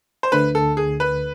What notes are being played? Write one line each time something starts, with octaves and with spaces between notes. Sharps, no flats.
C5
D2 D3 A3 B4
A4
G#4
B4